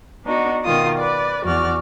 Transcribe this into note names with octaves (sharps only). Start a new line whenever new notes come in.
B3 D4 D#4 F#4
B2 D#3 F4 D#6
B4 D5
E2 F#4 D5 F6